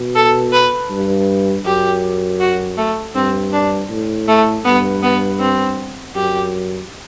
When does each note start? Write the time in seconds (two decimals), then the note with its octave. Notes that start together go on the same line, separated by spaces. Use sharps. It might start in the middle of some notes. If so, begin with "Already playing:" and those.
Already playing: B2
0.15 A4
0.53 B4
0.90 G2
1.66 F#2 G4
2.40 F#4
2.78 A3
3.15 G2 C4
3.53 D4
3.90 A2
4.28 A3
4.65 G2 B3
5.03 B3
5.40 C4
6.15 F#2 G4